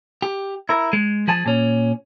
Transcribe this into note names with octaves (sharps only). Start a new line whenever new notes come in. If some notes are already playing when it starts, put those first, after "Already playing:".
G4
E4 A#4
G#3
F3 G#4 G#5 A5
A#2 C#4